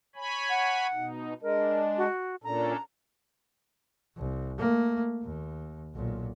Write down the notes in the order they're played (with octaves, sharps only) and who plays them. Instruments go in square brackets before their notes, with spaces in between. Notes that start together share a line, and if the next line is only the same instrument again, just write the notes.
[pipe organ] C#5 G#5 B5
[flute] F#5
[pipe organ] B2 D#4
[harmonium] G#3 [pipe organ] D4 [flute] A#4
[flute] F#4
[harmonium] A#2 [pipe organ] C#4 D4 A4 [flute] A#5
[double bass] C2
A3 A#3
D#2
B1 A#2